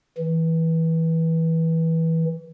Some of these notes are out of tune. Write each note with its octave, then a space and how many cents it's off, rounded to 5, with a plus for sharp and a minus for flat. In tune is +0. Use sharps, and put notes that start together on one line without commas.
E3 -20